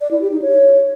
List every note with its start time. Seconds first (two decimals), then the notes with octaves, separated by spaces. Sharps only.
0.01 D5
0.11 E4
0.21 G4
0.32 D#4
0.42 C#5